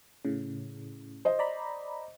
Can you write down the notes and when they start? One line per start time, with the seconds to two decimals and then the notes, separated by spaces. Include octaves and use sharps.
0.25 A2 C#3
1.25 C5 D#5
1.39 D5 A#5 B5